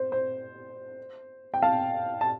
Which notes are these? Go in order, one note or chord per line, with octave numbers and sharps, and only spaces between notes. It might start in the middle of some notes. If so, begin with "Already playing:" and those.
Already playing: C5
C5
G5
F5 A5
A5